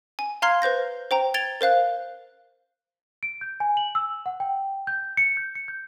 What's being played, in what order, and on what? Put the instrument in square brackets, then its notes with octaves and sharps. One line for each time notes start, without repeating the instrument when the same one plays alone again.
[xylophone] G#5
F5 A#5 C6 F6 G#6 C7
B4 C5 G6 A#6
C5 G5 A#5
G#6 A6 D7 F7 G7
A#4 C5 F5 F#6
[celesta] D7
G6
G#5
F#7
E6
F#5
G5
G6
C#7
G6
C#7
G6